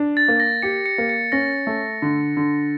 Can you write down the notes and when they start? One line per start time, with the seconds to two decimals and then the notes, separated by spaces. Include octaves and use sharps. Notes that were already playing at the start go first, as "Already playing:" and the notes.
Already playing: D4
0.17 A6
0.28 A#3
0.40 A#6
0.62 G4 C#7
0.86 C#7
0.98 A#3
1.09 C#7
1.32 C#4 A#6
1.67 A3
2.02 D3
2.37 D3